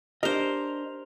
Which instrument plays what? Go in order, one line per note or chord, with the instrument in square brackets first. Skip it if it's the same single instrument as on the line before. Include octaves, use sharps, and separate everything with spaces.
[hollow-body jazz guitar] D4 D#5 [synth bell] G4 F7 [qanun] A#4 C5